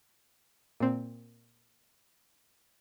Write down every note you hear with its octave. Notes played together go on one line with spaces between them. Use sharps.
A#2 C4